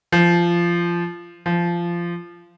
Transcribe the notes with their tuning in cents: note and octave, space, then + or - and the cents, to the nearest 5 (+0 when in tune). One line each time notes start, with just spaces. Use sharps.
F3 -20
F3 -20